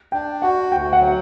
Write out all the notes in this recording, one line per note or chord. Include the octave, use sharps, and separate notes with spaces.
D4 G5
F#4 F#5
D2 G5
F#5
F#3